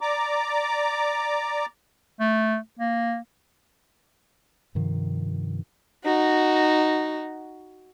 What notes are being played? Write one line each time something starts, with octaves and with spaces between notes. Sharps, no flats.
D5 A#5 D6
A3
A#3
G2 C3 D#3 F3
D#4 F#4